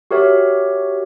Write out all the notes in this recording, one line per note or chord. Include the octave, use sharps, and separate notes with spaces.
F#4 G4 A#4 C#5 E5